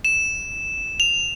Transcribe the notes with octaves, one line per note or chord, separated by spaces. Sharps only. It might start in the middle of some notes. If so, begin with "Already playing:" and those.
E7
F7